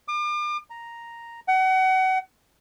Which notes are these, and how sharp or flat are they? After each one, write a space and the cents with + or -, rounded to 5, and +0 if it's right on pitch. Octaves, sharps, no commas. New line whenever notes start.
D6 +40
A#5 +0
F#5 +30